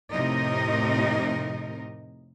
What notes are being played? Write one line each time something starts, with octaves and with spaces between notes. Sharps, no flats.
F2 A2 C3 D#4 A#4 D#5